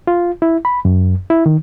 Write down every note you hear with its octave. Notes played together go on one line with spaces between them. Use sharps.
F4
E4
B5
F#2
E4
D#3